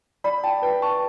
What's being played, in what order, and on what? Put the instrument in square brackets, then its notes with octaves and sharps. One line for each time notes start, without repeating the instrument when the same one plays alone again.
[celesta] D5 [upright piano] B5
[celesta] G5 [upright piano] A5
[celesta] B4 [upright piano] G5
[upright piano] A5 [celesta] C#6